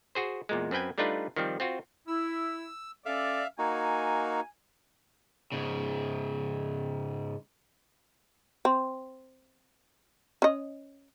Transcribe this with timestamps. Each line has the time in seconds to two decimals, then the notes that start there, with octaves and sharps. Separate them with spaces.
0.15 F#4 G#4 C5
0.49 E2 A#2 G#3
0.71 F#2 C4 B4 G5 G#5
0.98 G3 A3 D4 D#4 F4 B4
1.36 D#3 F3 G3 C4
1.60 C4 F4 F#4
2.08 E4 E6
3.06 C#4 A4 D5 E5 F5
3.59 A#3 D#4 F#4 G#5
5.52 G#2 C#3
8.65 C4
10.42 C#4 D#5